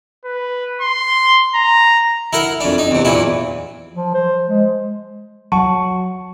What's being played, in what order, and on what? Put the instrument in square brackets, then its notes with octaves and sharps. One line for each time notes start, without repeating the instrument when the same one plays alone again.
[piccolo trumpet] B4
C6
A#5
[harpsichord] E4 A#4 F#5
F2 D4
D#4
E2 C3
E2 A#2 E4
[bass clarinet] F3
C5
G#3
[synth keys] F#3 [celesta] A5 [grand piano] C#6